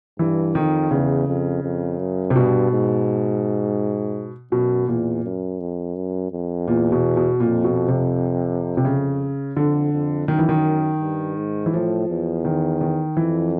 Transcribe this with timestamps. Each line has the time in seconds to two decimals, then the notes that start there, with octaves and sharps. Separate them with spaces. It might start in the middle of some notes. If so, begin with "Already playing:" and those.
0.19 G2 E3
0.55 F2 D#3
0.91 E2 C#3
1.28 F2
1.63 F2
1.99 F#2
2.30 C3
2.35 G2 B2
2.72 G#2
4.52 F#2 B2
4.88 E2 A#2
5.24 F#2
5.60 F2
5.96 F#2
6.32 F2
6.68 E2 A#2
6.92 B2
7.17 B2
7.40 F2 A#2
7.64 B2
7.88 C3
8.77 C3
8.85 C#3
9.57 F2 D3
9.93 F2
10.28 F#2 D#3
10.39 E3
10.49 D#3
11.01 G2
11.36 G#2
11.66 E3
11.73 A2 F3
12.09 E2
12.45 D#3
12.81 D#3
13.17 F2 E3